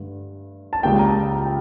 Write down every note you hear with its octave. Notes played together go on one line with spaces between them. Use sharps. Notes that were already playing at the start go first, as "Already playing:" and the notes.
Already playing: G2 D3 A3
A5
C#2 C#3 G3 A#3 G5
A#5
A5
A#5
G5